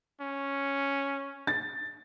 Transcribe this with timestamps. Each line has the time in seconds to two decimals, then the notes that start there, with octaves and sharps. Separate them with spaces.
0.20 C#4
1.47 A6